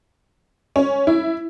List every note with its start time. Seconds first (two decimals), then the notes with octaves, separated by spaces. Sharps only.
0.76 C#4
1.07 E4